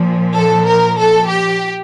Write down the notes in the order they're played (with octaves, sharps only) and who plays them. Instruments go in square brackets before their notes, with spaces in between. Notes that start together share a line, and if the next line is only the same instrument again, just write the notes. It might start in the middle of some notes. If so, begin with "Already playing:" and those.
Already playing: [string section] A#2 F3
A4
A#4
A4
G4